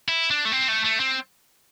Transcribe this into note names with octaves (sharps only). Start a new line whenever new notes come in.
E4
D4
A3
C4
A3
A3
C4